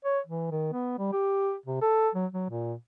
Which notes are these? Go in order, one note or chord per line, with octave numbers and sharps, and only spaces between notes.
C#5
E3
D#3
B3
G3
G4
C3
A4
F#3
F#3
A#2